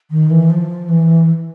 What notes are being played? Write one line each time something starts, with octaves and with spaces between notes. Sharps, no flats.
D#3
E3
F3
E3